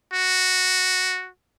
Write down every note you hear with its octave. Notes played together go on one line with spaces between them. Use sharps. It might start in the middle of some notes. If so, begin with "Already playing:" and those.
F#4